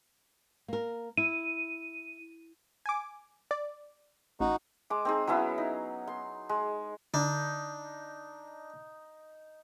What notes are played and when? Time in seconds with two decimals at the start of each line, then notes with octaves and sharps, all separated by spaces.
0.68 A#3 A#4
1.17 E4 D#7
2.86 G#5 D6
3.51 D5
4.40 A1 D#4 F#4
4.90 G#3 D6
5.05 C4 D#4 G#4
5.27 F#3 B3 C#4 E4
5.58 D#4
6.08 C6
6.49 G#3
7.14 D3 D4 D#4